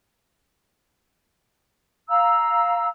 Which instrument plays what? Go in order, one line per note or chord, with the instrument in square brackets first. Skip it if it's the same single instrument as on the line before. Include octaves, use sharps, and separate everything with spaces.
[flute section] F5 A#5 E6